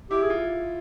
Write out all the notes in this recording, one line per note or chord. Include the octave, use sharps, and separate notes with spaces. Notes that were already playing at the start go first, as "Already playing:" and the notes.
E4 G4
G#4
F4